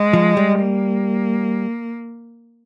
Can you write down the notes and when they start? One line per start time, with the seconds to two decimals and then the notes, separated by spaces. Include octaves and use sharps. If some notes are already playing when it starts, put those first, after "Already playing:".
Already playing: G#3
0.13 F3
0.37 G3
0.62 A#3